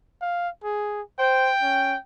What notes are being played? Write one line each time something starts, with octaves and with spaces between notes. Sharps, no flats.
F5
G#4
C5 G5
C#4